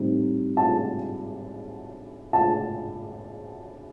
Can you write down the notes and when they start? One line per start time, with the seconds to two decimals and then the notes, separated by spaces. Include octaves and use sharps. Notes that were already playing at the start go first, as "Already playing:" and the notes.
Already playing: A2 G3 C4 D#4
0.57 A5
2.33 A5